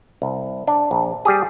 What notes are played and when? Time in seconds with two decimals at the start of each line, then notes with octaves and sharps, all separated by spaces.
0.22 C2
0.67 D4
0.91 A#1
1.25 G3 G4 G#4